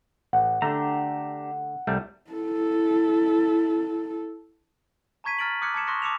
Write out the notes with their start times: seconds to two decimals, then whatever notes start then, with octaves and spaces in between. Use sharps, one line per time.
0.33 A1 F#5
0.62 D3 A3 D4 G4 A#5
1.87 C2 G3 A3
2.31 E4 A4
5.24 A5 A#5 C#6 G#6 B6 D#7
5.39 A#5 F6 A6 D7 F#7
5.62 D6 D#6 F6 F#6 G#6 C#7
5.74 A5 D6 G#6 C#7 E7
5.87 C6 C#6 D#6 F#6 A#6 C#7
6.02 A5 D6 E6 C#7 E7 F7